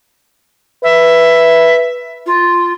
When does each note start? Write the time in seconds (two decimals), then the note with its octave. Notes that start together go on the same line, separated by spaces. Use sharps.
0.83 B4 E5
2.26 F4